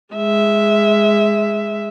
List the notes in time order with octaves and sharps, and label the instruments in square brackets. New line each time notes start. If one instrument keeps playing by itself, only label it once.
[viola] G#3 E5